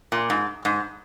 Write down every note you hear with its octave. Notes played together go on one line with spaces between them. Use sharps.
A#2
G#2
G#2